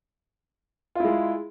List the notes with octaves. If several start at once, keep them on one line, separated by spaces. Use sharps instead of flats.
G#3 E4 F4